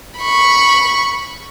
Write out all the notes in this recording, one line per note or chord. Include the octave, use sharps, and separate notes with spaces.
B5 C#6